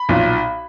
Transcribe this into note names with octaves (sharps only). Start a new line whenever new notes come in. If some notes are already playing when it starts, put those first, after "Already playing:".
Already playing: B5
B1 A#2